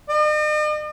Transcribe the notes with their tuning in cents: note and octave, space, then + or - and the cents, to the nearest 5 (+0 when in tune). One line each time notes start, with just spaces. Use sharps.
D#5 -45